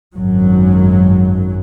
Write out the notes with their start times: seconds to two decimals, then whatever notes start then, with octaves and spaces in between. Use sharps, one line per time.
0.16 G#1 F#2 F#3